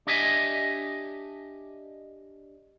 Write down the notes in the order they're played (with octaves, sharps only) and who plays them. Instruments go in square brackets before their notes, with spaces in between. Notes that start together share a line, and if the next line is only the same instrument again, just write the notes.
[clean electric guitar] D4 G4 D#5 E5 G#5